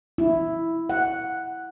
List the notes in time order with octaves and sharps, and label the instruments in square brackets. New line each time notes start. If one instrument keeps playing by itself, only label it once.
[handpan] E4
F#5